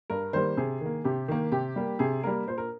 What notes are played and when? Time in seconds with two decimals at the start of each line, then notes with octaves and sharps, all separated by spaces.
0.10 G2 A#4
0.33 D#3 G3 A#3 C5
0.57 C3 G#4
0.81 D#3 A#3
1.04 C3 G4
1.28 D#3 A#3
1.52 C3 G4
1.76 G3 A#3
1.99 C3 G#4
2.23 G3 A#3 A#4
2.47 A#2 C5
2.58 A#4